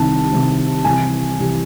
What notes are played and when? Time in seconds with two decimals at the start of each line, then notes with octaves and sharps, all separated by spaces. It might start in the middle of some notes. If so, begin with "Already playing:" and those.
Already playing: C2 C3 D#3 A5
0.31 C2 C3 D#3
0.84 C2 C3 E3 G#5
1.39 C2 C3 E3